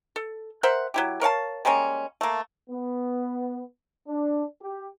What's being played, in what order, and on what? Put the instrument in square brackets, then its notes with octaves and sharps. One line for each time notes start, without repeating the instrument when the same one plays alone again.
[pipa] A4
A#4 C5 E5 F#5
F#3 E4 G4
A#4 C#5 F5 A5
G3 G#3 A#3 C#4
A3 A#3
[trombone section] B3
D4
G4